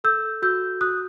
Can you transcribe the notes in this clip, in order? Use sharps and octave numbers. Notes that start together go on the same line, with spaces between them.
A4 E6 G6
F#4 E6 G6
F#4 D#6 F#6